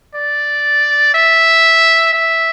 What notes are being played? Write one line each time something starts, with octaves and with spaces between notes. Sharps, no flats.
D5
E5
E5